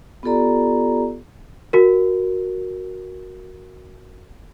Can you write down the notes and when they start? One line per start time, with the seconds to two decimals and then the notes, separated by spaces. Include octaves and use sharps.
0.23 B3 F4 G4 A4 D5 A#5
1.73 F#4 A#4